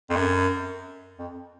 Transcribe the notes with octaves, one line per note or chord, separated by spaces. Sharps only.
F2
F#2
F2